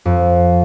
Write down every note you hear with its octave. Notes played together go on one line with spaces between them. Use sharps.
F2